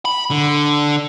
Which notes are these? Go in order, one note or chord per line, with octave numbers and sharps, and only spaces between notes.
B5
D3